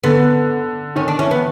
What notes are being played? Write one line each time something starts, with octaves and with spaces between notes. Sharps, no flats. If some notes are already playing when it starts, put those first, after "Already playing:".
D3 B3
D#3 C#4
D4
E3 C#4
B3